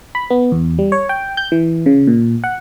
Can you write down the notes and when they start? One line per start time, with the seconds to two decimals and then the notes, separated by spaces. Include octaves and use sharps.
0.15 B5
0.30 B3
0.52 E2
0.79 G3
0.92 C#5
1.09 G5
1.37 G6
1.52 E3
1.86 C#3
2.07 A#2
2.44 F#5